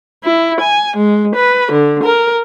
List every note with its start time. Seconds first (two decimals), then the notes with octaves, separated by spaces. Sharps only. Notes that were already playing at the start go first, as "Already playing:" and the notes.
0.24 E4
0.61 G#5
0.97 G#3
1.36 B4
1.72 D3
2.04 A#4